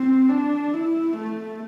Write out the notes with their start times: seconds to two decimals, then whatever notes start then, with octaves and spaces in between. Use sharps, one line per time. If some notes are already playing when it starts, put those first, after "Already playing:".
Already playing: C4
0.29 D4
0.73 E4
1.17 A3